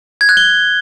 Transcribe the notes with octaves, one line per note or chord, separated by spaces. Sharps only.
G#6
F#6
G7